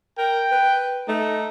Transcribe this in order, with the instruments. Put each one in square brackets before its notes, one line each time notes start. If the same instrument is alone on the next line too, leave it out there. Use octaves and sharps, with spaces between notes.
[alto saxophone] A#4 [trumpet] G5
[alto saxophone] B4
[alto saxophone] A3 [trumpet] D#4